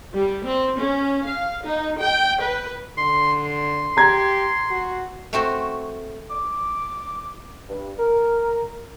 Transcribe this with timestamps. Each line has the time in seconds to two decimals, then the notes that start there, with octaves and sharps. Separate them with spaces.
0.13 G3
0.44 C4
0.79 C#4
1.25 F5
1.64 D#4
2.00 G5
2.41 B4
2.98 D3 C6
3.46 C6
3.97 G4 A#5 G#6
4.70 F#4
5.33 A3 C4 F#4 C5
6.31 D6
7.69 G2
7.99 A#4